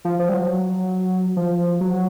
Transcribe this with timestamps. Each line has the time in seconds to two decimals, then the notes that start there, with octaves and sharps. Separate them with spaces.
0.05 F3
0.19 F3
0.29 G3
0.34 F#3
1.36 F3
1.81 F#3